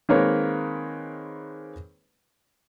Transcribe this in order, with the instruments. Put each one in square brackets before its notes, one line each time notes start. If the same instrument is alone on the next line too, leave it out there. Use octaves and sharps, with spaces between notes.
[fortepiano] D#3 G#3 A#3 C4 B4 C#5